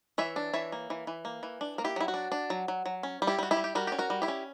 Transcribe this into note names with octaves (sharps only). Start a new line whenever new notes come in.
E3 C#5 E5
D4
E3 C#5 E5
A#3
E3
E3
A#3
E3
D4
A#3 A#4
E4 G4
F#3 E4
F#4
D4
D4
F#3
F#3
F#3
C#4
G3
E4 G4
G3 F#4
E4 G4
G3
G4
G3 F#4 A#4
C#4 G4
F#4 A#4
G3
E4 G4
C#4